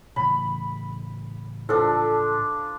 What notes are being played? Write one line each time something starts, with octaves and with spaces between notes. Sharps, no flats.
A2 C#3 E3 B5
F3 D4 A4